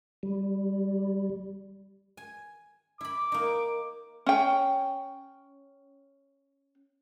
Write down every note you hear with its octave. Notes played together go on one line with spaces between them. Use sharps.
G3
G#5
E4 B5 D6
A#3 D#4
C#4 G5